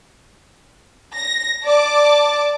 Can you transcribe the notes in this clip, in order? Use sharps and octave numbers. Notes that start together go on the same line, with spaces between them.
A#6
D5 A5 D6